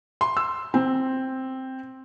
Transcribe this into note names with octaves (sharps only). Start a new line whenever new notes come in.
C6
E6
C4